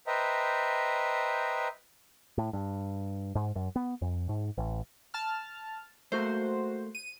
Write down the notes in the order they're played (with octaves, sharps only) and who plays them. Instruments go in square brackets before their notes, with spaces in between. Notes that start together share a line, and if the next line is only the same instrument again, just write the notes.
[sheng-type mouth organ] B4 C5 D#5 E5 G5 A#5
[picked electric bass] A2
G2
G#2
F#2
B3
F2
G#2
A1
[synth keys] A5 F6
[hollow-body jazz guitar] A3 A#3 [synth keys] F#4 C5
[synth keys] D#7